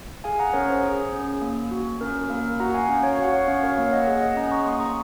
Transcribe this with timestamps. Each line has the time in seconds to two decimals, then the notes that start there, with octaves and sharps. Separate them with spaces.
0.24 G#4 F5 G#5
0.39 F#5 A#5
0.53 C#4 A#4 C#5
0.69 C5
0.83 G#4
1.12 C#4
1.42 A#3
1.71 F#4
2.01 C#4 A#4
2.16 A#4
2.30 A#3 A#4
2.60 F#4 F#5 A#5
2.74 F5 G#5
2.89 C#4
3.03 C#5 F5
3.19 F#4 F#5
3.33 C#5 F5
3.48 C#4 C#5 F5
3.63 A#4 C#5
3.77 A#3 C#5 F5
3.92 D#5 F#5
4.07 G#4 D#5 F#5
4.21 D#5 F#5
4.36 C#4 F#5 A#5
4.52 A#5 C#6
4.65 A#3 C6 D#6
4.80 A#5 C#6